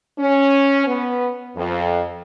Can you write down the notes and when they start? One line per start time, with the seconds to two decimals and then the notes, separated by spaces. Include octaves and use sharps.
0.18 C#4
0.87 B3
1.55 F2